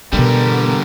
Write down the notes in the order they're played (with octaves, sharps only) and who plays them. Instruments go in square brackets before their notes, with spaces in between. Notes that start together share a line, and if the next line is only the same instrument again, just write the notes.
[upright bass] B2 E3 [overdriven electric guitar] D3 G3 [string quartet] B3 A#4